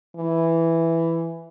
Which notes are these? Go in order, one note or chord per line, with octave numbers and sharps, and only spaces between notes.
E3